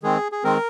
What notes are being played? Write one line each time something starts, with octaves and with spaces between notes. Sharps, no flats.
D#3 G#3 C4 G#4
G#4
D#3 G#3 C4 A#4